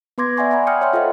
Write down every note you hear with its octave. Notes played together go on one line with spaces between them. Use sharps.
B3 B4 C6 D6 G#6 A#6
D5 E5 F#5 G#5 C6 C#6
D5 F#5 G#5 A#5 B5
G5 C6 D#6 F6 G6 C#7
C#5 E5 F#5 G5 C6
F4 A4 C5 D#5 F5